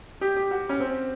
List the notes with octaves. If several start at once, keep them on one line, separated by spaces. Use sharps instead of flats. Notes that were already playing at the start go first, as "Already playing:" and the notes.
G4
G4
F#4
C#4
C4